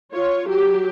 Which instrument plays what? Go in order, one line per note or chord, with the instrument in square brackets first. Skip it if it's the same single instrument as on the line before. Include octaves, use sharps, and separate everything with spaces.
[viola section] F4 C#5
F#3 G4